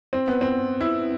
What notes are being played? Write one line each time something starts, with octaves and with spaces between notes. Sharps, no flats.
C4
B3
C4
E4